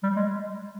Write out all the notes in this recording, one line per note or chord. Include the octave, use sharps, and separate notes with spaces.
G3
G#3